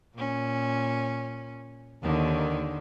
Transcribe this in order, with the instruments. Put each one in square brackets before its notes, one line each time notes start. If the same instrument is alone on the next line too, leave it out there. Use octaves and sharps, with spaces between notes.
[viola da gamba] A#2 C#4
[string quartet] D#2 [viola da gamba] D3 D#3